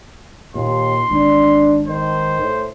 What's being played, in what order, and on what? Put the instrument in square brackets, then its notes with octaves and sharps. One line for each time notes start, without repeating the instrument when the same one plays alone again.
[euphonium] D#2 [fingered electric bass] A#2 [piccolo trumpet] C6
[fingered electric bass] G#1 G#2 [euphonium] D4
[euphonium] D#3 [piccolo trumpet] C5
[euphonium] A2